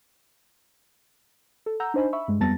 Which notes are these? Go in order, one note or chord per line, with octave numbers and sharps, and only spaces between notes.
A4
F#5 A#5 E6 G6
D4 D#4 C5 D#5 G#5 B5
E5 B5 C#6 E6
G2 G#3
F2 G3 B3 A5 A6 A#6